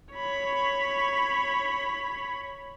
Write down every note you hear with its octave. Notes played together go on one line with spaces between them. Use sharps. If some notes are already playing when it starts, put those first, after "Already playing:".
C#5 B5